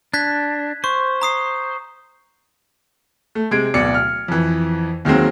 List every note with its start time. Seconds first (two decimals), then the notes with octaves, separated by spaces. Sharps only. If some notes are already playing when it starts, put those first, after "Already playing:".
0.14 D4 F#6 G#6 B6
0.84 C5 C#6
1.21 A#5 D#6 C7
3.35 A3
3.51 C3 G#3 G#6 D7
3.74 D1 B2 D5 C#7
3.94 F6
4.28 F2 E3
5.05 D#2 D#3 F#3 G#3 C4